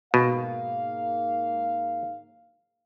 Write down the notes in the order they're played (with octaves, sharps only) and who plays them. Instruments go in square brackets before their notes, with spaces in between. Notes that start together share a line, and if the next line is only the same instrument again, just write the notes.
[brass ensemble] G#2 A#3 F5 [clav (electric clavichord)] B2